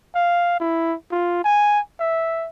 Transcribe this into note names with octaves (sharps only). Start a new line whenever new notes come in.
F5
E4
F4
G#5
E5